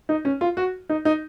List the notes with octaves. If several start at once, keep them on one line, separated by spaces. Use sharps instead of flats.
D#4
C#4
F4
F#4
D#4
D#4